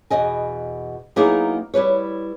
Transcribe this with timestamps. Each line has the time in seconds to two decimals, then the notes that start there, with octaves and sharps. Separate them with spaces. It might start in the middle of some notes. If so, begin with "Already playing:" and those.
0.10 E2 B2 D#5 G#5
1.16 F#3 A#3 B3 D#4 E4 G#4
1.74 G3 E4 B4 C#5